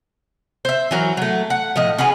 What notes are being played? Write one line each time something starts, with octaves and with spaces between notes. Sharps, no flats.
C5 E5
E3 F#3 A#4
F#3 A3
F#5
A2 F3 D#5
C#4 F#4 G#4 B4